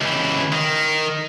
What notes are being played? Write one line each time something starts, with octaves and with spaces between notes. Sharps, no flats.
C#2 E3
D#3